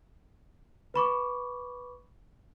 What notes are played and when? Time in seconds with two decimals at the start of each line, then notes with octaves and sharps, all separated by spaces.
0.94 B4 B5 C#6 D6